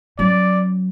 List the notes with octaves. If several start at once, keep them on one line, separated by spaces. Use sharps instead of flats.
F#3 C#4 D5